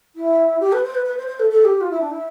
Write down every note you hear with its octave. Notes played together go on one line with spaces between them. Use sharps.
E4
G4
B4
C5
B4
B4
C5
C5
A4
A4
G4
F4
E4
D4
E4